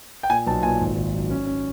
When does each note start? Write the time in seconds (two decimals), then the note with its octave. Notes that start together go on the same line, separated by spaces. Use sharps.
0.23 G5
0.30 A#2 G#5
0.47 B1 A5
0.63 A#2 G#5
0.81 G#1
0.96 G#1
1.14 F#3
1.30 C#4
1.47 C#4